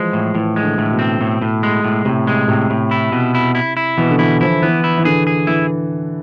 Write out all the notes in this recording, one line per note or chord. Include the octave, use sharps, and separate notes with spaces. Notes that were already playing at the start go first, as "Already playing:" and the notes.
Already playing: E3 F3 G#3
A2
A2 E3
G#3
D3
A2
B2
C4
A2
A2
G#3
A2
A2 C3
G#3
A2 C3
A2
E4
B2
E4
E4
E4
B2 E3
D3
E3 E4
F3 E4
E3 B3
E4
E3
D3 G#4
G#4
E3 E4